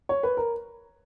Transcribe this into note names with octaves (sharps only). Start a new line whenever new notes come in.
C#5
B4
A#4